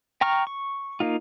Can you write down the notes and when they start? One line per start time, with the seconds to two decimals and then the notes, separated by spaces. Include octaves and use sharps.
0.21 G5 A#5 C#6 F6
0.47 C#6
1.00 A#3 D#4 F4